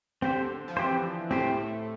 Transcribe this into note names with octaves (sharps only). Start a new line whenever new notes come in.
D3 C4 G4 C5
F3
E3 C4 G4 C5
A2 A3 C4 G4 C5